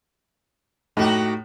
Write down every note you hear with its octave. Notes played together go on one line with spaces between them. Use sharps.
A2 D#4 F#4 G4